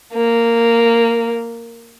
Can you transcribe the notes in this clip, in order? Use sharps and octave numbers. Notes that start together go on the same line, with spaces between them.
A#3